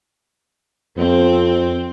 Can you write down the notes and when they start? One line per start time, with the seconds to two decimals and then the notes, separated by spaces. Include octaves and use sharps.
0.97 F2 C4